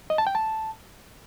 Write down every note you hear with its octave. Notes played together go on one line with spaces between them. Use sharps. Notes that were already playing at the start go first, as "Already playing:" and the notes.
D#5
A5
G5
A5